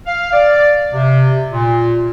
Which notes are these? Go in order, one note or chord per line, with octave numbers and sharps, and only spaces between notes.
F5
D5
C3
A#2